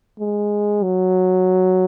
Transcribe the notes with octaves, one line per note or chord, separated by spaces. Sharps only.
G#3
F#3